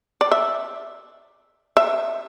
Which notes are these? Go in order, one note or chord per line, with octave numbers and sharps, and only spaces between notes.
D5
E5
E5